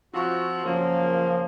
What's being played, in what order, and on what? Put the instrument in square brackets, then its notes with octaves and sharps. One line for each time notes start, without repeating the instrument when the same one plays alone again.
[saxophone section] F3 C4 F#4 [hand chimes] F4 C#6
[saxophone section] F#2 C#3 A#3 [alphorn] F3